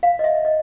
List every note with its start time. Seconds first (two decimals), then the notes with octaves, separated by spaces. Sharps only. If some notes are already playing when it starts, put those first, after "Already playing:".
0.03 F5
0.19 D#5
0.24 E5
0.45 D#5